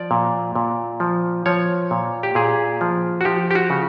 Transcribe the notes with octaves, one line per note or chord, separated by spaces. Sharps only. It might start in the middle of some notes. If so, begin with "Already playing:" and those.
Already playing: F3 D5
A#2
A#2
F3
F3 C#5
A#2
G4
A#2 G#4
F3
F#4
F3 G4
G4
F#4
C#3